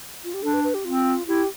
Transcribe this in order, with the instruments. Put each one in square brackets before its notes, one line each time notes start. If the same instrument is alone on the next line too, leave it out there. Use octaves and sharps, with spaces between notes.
[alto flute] F4
G4
[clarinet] D4 [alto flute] A4
[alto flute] B4
B4
G4
[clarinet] C4 [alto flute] F4
[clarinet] E4 [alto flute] G4